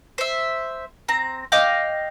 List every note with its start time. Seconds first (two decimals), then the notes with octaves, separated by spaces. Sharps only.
0.18 C5 E5
1.08 C4 A#5
1.52 D#5 F5 G5 D6